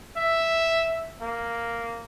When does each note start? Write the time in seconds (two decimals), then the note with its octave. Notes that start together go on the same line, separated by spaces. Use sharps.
0.17 E5
1.21 A#3